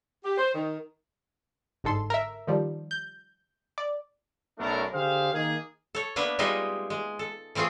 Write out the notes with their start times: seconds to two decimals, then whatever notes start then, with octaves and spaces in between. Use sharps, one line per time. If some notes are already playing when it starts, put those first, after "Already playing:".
0.24 G4
0.37 C5
0.54 D#3
1.84 G1 G#2 D3 A4 C6
2.10 A#4 E5
2.47 D#3 F3 G3
2.91 G6
3.78 D5
4.58 B1 F#2 A3 B3 D4 A#4
4.92 D3 G4 G#4 C5 F5
5.33 D#3 A#3 G#4
5.95 A4 C#5
6.16 A#3 B3 D4 B4 E5
6.39 G3 G#3 D#4 F4 D#5 E5
6.90 G#3
7.19 A4
7.55 E3 A3 C4 F4 G#4